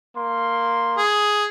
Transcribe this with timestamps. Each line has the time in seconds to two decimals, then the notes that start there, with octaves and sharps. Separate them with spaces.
0.17 A#3 C6
0.98 G#4